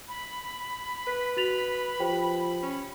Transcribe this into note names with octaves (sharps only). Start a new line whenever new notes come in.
B5
B4
F#4 A6 F7
F3 G4 C5 G5
C#4